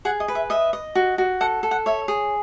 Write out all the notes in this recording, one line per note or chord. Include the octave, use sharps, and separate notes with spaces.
G#4 F#5
D#5
B4
E5
D#5 E5
D#5
F#4
F#4
A4 F#5
A4
F#5
C#5 E5
G#4